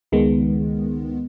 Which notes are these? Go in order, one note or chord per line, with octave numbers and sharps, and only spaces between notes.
C#2 D#3 G#3 B3